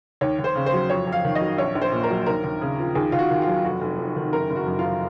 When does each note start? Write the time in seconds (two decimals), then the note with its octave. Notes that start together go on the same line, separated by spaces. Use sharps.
0.21 D#2 C#5
0.39 D#2
0.44 C5
0.56 C#3
0.66 C5
0.73 F#3
0.90 F2 C#5
1.07 F2
1.12 F5
1.24 D#3
1.35 D#5
1.41 F#3
1.58 A#1 C#5
1.75 A#1
1.82 C5
1.92 A#2
2.04 A#4
2.10 F#3
2.26 D#2 A#4
2.44 D#2
2.61 C#3
2.79 F3
2.95 D#2 G#4
3.12 D#2 F4
3.19 F#4
3.31 D#3
3.42 F4
3.47 F#3
3.64 F1 F#4
3.81 F1
3.98 F2
4.16 D#3
4.33 F#1 A#4
4.50 F#1
4.56 F#4
4.67 F#2
4.79 F4
4.84 F3